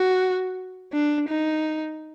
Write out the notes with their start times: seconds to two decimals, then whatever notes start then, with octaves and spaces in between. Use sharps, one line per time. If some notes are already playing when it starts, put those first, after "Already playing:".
Already playing: F#4
0.93 D4
1.29 D#4